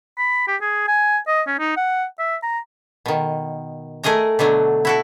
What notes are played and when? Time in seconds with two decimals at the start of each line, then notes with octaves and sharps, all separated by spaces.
0.18 B5
0.48 G4
0.61 G#4
0.88 G#5
1.27 D#5
1.47 C#4
1.59 D#4
1.77 F#5
2.19 E5
2.43 A#5
3.06 B2 D#3
4.04 A3 G#4 A#4 D#5 A#5
4.39 B2 D3 F#3 A3
4.85 E4 F#4 A4